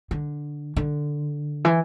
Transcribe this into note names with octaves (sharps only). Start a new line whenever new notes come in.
D3
D3
E3